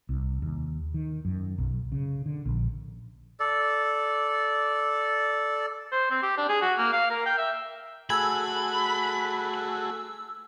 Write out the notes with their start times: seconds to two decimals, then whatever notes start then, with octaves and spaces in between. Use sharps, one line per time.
0.09 C2
0.42 D#2
0.94 D#3
1.25 F#2
1.58 B1
1.92 C#3
2.26 D3
2.46 A#1
3.40 A4 D5
5.92 C5
6.11 C4
6.22 G4
6.38 D4
6.49 G#4
6.62 F#4
6.78 A#3
6.93 F5
7.10 A#4
7.26 G5
7.38 E5
8.10 A3 F#4 G#4 G#5 B5 E6